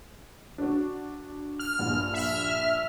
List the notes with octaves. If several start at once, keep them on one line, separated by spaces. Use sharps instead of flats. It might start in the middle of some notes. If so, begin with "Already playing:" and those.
D4 F#4
F6
A#1 G2
E5 F6